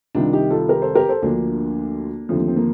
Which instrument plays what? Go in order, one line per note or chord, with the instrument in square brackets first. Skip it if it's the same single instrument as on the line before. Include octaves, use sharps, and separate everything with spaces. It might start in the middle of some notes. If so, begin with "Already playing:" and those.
[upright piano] C2 C3 D#3 D4 F4
D#4 G4
F4 A4
G4 A#4
A4 C5
G4 A#4
A4 C5
D2 D3 F3 A#3 D4
D#2 D3 F3 A3 C4
C4
A#3